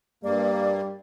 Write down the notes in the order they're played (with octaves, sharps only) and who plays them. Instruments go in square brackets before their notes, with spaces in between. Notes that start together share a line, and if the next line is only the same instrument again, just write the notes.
[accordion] G2 A#3 [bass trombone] G3 [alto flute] D5